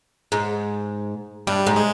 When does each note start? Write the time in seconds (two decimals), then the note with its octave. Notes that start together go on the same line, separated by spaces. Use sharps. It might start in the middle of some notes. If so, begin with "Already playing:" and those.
0.32 G#2
1.47 G2 G3
1.66 G#2
1.76 G#3